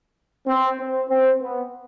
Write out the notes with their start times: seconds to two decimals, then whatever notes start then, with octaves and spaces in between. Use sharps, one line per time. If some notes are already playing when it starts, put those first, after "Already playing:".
0.46 C4
0.78 C4
1.09 C4
1.40 B3